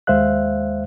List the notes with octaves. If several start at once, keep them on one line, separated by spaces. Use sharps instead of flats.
D#2 G#3 C5 E5 F5 F#6